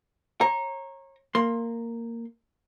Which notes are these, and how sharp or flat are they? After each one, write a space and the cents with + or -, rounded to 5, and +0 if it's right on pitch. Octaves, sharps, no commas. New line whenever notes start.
C#5 -30 A#5 +0
A#3 -10 C6 +15